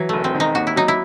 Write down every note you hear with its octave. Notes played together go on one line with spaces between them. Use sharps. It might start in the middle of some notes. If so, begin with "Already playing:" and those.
Already playing: E3 F#3
E1 A3
C4
D#3
D#4
D#2 F#4
E4
F#3 D#4
E4